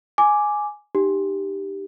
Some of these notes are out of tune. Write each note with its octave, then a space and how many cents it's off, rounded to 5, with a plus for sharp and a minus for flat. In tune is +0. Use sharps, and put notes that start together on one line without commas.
G#5 +5 D6 +0
D#4 -25 G4 +0